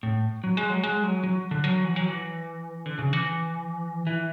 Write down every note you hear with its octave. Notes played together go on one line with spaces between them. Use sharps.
A2
F#3
G#3
F#3
G#3
F#3
F#3
D3
F#3
E3
F#3
E3
D3
C#3
E3
E3